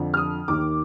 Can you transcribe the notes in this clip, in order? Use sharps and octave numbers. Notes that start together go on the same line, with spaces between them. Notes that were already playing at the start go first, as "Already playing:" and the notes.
Already playing: F2 D3 F3
F6
D#6
D#2 D#3 D6